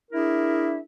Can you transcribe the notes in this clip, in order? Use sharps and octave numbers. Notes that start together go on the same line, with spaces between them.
D4 E4 G#4 A#4 E5